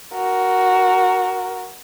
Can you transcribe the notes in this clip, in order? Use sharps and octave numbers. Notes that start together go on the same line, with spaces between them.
F#4 A#4